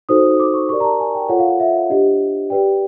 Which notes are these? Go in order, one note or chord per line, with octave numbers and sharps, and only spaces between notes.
D#4 F#4 A4 C5 D#6
D6
C#6
G4 A#4 D5 C#6
A#5
A5
G#5
G5
F4 A4 C#5 F#5
F5
F5
E5
D4 G4 C5 D#5
G4 B4 D5 G5